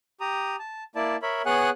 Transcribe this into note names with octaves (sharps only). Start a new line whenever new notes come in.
G4 A#5 D#6
A5
A#3 E4 D5 A5
A#4 C#5 E5 B5
B3 G#4 C#5 F#5 G#5 F#6